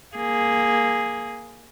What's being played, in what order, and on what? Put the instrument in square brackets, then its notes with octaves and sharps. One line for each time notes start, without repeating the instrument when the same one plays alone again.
[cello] A#3 G#4